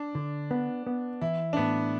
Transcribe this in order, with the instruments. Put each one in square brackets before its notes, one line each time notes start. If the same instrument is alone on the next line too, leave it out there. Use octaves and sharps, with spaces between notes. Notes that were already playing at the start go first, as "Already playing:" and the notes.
Already playing: [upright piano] D4
[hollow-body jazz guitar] D3
B3
B3
[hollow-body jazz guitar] E3 [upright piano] E4
[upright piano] D4
[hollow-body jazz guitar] A2 [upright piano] B3